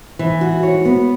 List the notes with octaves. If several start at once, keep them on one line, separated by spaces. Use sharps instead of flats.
E3
F#4
C#5
B3